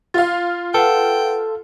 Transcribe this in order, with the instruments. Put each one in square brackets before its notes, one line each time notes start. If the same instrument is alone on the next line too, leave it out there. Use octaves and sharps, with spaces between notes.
[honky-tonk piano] F4 F5 [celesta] A6
[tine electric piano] A4 [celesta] B4 F#5 [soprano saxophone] G5